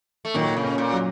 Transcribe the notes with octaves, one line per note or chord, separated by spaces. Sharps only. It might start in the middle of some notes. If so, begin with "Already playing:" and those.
A3
A#2 D#3 F#3
C#3
C#4
A#2
F#3